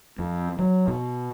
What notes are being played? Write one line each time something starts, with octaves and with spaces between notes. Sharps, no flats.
F2
F#3
B2